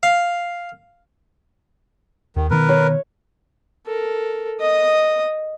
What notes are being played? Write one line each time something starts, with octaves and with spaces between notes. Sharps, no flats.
F5
D#2 D#3
B2 D#3 B3 A#4 B4
C#5
A4 A#4
D#5 D#6